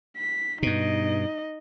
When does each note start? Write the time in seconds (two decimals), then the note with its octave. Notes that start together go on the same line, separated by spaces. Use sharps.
0.17 B6
0.63 G2 B2 D#4 D#5